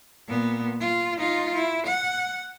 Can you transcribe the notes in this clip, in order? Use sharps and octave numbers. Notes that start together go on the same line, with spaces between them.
A#2 B3
F4
D#4 F4
E4
F#5